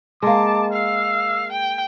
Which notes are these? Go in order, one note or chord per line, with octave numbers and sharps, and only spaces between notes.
G#3 A#3 A5 D6
F5 E6
G5